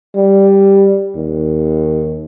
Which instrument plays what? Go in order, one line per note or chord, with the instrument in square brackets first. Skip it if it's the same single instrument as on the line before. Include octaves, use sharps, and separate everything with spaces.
[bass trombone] G3
D#2